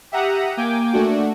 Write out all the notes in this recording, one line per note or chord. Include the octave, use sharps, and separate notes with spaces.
G4 E5 F#5 A#5 D#6
A#3 G5 G#5 D6
A3 D4 F#4